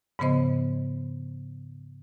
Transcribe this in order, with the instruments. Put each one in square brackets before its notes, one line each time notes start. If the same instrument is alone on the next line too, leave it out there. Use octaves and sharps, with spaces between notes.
[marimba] G#2 C#3 F3 B3 C5 D#5